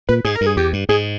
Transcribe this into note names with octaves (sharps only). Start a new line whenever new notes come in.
A#2 B4
G#2 G#4
A#4
G2
G#4
E2 G4
G2
G#2 G#4